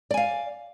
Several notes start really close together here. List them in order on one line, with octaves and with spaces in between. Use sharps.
D5 G#5 F5